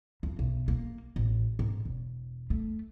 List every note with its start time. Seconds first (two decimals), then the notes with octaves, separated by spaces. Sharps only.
0.23 F2
0.39 B1
0.68 A#3
1.16 A1
1.59 G#2
1.85 E1
2.50 A3